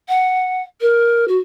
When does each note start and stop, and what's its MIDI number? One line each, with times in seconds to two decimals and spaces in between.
0.08 0.61 78
0.81 1.25 70
1.28 1.37 66